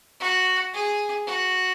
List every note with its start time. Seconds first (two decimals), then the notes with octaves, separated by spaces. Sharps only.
0.20 F#4
0.74 G#4
1.26 F#4